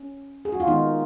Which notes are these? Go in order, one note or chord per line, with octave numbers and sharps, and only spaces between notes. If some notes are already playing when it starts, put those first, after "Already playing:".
Already playing: C#4
G#4
F#4
F4
D#3 G#3 B3 D#4